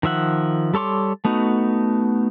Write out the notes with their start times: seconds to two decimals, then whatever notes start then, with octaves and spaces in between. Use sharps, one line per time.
0.03 D#3 F3 E5 F#5
0.74 G3 A4 C#5 C6 D6
1.25 A3 B3 D#4 F#4